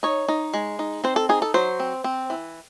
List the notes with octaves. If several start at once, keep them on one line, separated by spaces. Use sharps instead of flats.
D#4 C#5
D#4
G#3
D#4
C4 C5
A4
D#4 G#4
A4
F#3 C5
C4
C4
E3